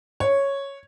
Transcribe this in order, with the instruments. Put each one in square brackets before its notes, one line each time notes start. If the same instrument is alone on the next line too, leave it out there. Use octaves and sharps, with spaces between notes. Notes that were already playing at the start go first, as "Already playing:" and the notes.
[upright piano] C#5